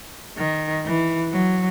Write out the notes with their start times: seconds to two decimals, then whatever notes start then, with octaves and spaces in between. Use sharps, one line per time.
0.38 D#3
0.85 E3
1.32 F#3